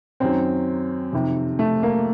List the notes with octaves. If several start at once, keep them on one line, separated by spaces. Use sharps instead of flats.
F#2 D#3 F#3 C4
F2 C3 D#3
A3
A#3